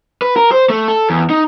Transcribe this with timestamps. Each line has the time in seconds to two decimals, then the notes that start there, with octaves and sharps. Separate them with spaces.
0.22 B4
0.36 A#4
0.52 C5
0.70 A3
0.88 A4
1.10 E2
1.30 D#4